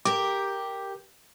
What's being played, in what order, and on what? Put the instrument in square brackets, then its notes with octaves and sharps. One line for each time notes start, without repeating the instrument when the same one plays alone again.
[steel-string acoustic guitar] G4 A#4 [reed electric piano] D6